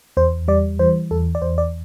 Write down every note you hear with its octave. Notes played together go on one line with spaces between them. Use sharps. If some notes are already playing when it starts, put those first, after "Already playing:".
E2 C5
G3 D5
E3 C5
E2 A4
D5
E2 C5
D5